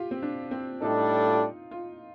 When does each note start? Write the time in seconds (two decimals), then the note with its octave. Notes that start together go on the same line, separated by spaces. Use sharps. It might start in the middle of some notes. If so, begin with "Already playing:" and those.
Already playing: F4 G4
0.11 C4
0.23 D4
0.51 C4
0.81 A2 G3 D4 D#4 A4 D5
1.26 F4
1.71 F4